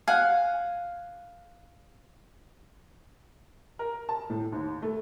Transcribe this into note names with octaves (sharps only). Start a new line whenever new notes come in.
F5 F#5 G#5
A#4
A5
A2
D#2
A3